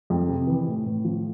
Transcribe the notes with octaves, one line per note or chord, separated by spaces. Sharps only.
F2
C3
E3
A2
A2
F3